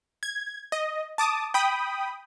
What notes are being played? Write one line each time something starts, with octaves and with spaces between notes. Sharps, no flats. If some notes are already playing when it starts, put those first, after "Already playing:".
G#6
D#5
A5 D6 D#6
G5 B5 D#6